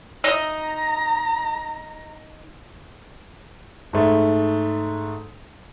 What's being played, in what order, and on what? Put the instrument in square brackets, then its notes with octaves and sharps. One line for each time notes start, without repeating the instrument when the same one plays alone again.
[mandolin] D#4 D#5 [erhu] A#5
[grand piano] G#2 A3